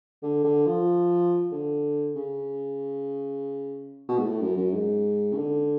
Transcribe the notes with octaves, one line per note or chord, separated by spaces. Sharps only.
D3
D3
F3
D3
C#3
B2
G#2
A2
F#2
F#2
G#2
C#3
D3